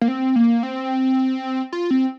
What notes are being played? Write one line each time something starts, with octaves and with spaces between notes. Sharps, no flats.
A#3
C4
A#3
C4
F4
C4